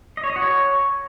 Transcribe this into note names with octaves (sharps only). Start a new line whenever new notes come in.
D#5
C#5
D#5
F#4
C#5